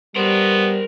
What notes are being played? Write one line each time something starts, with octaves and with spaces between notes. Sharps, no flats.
G3 B3 A#4 C5